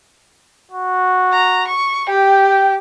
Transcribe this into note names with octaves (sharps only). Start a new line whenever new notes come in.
F#4
A#5
C#6
G4 G5